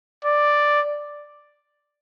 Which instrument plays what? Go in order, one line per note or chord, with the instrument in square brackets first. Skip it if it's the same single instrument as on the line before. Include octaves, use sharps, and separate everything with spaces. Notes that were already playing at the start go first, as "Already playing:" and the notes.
[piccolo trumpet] D5